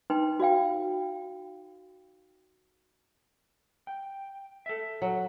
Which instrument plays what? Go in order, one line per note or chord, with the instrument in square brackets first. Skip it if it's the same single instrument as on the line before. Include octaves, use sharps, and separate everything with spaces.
[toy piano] D#4 B4 G5 C6
F#4 D5 F5 G5
[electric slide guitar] G5
A4 E5
[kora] F#3